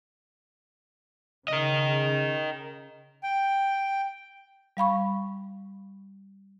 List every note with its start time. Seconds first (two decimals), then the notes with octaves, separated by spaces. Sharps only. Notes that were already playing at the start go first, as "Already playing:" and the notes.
1.48 C#3 A#4 D#5
3.23 G5
4.77 G3 F5 B5 C#6